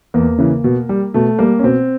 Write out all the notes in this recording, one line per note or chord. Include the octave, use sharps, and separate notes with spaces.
E2 A#3
C#3 E3
B2
G3
B2 A3
G3 A#3
C#4
B2 C4